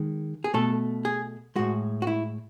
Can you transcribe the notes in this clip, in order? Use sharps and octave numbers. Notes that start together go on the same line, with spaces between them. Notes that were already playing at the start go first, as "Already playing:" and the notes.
Already playing: D#3 G#3
G#4
B2 A3 A4
G#4
A2 G#3 F#4
F#4
E4